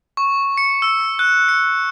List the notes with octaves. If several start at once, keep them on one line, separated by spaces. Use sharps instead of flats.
C#6
C#7
E6
F#6
C#7